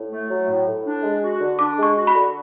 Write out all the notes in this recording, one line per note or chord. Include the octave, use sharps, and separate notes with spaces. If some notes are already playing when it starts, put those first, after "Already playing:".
Already playing: A2
A3
F#3
A2
A2
D4
G#3
F#4
D3
D4 D6
G#3
C#6
F#4
B5
D3